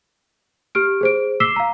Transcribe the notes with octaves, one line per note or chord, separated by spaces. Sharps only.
G4 F6 D7
G#4 C5 D7
D6 E6 B6 C7 E7 G7
F5 A#5